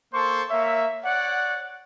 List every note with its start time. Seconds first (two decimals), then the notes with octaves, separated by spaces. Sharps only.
0.14 A#3 A4 C5 C6 C#6
0.50 A#3 C#5 E5
1.04 C#5 D5 F#5